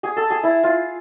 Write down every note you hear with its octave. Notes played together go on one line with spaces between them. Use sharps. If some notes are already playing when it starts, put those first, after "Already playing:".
G#4
A4
G#4
E4
F4